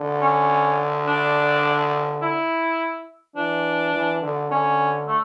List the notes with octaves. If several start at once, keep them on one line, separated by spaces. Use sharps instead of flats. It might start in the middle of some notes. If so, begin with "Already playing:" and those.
Already playing: D3
C#4
D4
E4
E3 D4
E3
D3
D3 C#4
A3